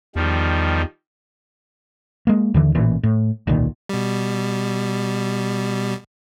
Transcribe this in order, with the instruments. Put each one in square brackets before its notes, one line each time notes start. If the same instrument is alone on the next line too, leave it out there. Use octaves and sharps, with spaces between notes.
[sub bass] E2 [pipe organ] D#3 F3 G3
[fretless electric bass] G#3 A#3
D#2 D3 E3
A1 A#2 E3
A2
D1 B1 A#2 D#3
[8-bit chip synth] B2 G3